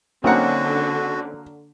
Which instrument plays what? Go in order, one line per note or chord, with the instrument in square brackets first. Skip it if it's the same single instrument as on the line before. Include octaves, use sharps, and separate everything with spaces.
[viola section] D3 [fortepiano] F#3 A#3 F#5 [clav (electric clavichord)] C4 C#4 D#4 [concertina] F#4